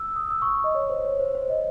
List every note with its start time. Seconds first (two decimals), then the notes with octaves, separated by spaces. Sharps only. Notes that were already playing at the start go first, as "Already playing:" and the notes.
Already playing: E6
0.16 D#6
0.31 E6
0.42 C#6
0.64 D#5
0.75 C#5
0.90 C5
1.05 C#5
1.20 C5
1.35 C5
1.49 D#5